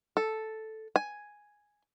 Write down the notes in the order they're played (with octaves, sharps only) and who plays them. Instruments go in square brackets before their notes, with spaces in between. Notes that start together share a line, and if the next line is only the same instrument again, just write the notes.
[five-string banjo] A4
G#5